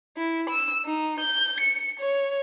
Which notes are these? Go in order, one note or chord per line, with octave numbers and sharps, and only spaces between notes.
E4
E6
D#4
G6
C#7
C#5